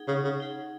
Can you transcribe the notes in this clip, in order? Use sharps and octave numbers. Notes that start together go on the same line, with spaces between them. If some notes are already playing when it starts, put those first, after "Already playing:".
Already playing: D#4 G#4 F#5
C#3
C#3
D#4 G#4 F#5